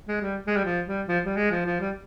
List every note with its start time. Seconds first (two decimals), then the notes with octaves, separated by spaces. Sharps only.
0.08 G#3
0.22 G3
0.47 G#3
0.56 G3
0.65 F3
0.87 G3
1.08 F3
1.26 G3
1.37 G#3
1.51 F3
1.66 F3
1.81 G3